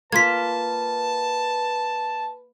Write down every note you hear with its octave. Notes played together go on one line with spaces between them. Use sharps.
A#3 F4 B4 A5 G#6 B6